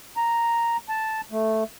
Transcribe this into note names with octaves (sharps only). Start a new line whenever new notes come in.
A#5
A5
A3